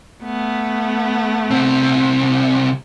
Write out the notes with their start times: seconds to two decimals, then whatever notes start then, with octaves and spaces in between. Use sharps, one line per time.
0.23 A3 B3
1.51 C2 C4